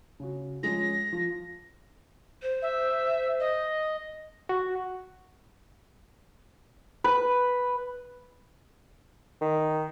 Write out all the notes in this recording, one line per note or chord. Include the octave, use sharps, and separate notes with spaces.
C#3 F#4
F3 G#3 C#4 A#6
F3
C5
E5
D#5
F#4
B4
D#3